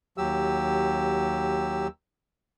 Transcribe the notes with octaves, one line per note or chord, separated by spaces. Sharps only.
D#2 F#3 G4 E6